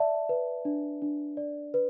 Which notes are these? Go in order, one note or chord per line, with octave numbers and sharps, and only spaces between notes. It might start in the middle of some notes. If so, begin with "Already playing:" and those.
Already playing: D5 E5 A5
B4
D4
D4
D5
B4